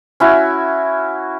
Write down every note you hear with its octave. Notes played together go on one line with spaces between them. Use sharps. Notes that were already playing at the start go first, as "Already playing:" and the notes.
C#4 E4 F#4